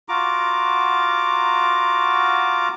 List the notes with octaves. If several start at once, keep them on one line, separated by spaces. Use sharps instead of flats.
F4 F#4 A#5 D6